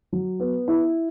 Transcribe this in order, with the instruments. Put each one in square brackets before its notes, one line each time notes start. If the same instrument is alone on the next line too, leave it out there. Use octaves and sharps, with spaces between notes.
[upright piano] F#3
B3
E4